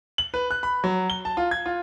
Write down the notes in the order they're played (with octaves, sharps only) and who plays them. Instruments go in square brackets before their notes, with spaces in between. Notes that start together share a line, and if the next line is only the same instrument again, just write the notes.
[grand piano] F#7
B4
F#6
B5
F#3
G7
A5
F4
G#6
F4